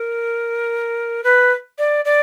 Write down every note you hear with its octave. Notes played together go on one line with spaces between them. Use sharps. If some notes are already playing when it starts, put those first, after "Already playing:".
Already playing: A#4
B4
D5
D5